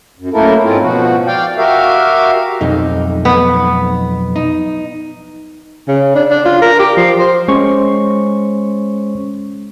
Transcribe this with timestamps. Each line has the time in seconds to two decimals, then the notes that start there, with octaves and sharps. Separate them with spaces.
0.19 F#2
0.34 F#2 A3 A#3 E4 A4 A#4
0.64 G#2 C4 C#4 E4 F4
0.82 B2 F3 F#4
1.27 D5 F5 G5
1.58 F#4 G4 A#4 E5 F5
2.61 B1 F2 D#4
3.25 B3
4.36 D#4
5.88 C#3
6.15 D4
6.30 D4
6.45 F4
6.62 A#4
6.80 G4
6.97 F3
7.19 C5
7.48 G#3 C#4 C5 C#6